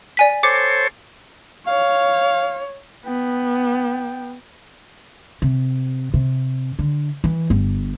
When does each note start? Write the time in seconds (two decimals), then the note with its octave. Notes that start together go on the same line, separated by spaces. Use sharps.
0.17 D5 G#5 B6
0.43 A4 C5 C#5 D6 C#7
1.67 C#5 F5
3.06 B3 G5
5.42 C3
6.14 C3
6.79 D3
7.24 E3
7.50 G1